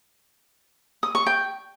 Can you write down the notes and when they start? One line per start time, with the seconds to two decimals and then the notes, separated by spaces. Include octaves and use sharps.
1.03 D#6
1.15 C#6
1.27 G5